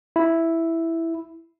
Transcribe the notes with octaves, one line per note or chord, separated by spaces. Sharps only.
E4